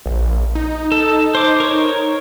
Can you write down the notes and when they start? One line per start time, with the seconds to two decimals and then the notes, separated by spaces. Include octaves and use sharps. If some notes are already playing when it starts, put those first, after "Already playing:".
0.06 A#1
0.55 D#4
0.92 A4
1.35 C5 D6
1.60 A#4 C#5